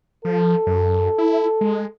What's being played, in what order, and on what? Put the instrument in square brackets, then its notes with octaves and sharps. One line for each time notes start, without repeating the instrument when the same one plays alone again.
[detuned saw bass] F3 [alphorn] A4
[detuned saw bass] F#2
E4
G#3